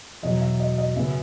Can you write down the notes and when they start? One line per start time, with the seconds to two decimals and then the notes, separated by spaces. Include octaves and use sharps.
0.23 E2 B2 F#3 D#5
0.41 E5
0.60 D#5
0.78 D#5
0.96 F#2 C#3 F#3 B3 E5